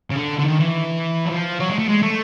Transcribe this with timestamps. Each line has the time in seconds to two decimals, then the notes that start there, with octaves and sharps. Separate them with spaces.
0.11 C#3
0.16 D3
0.39 D3
0.45 D#3
0.60 E3
1.26 F#3
1.32 F3
1.60 F#3
1.70 G#3
1.79 A3
1.88 G#3
2.02 A3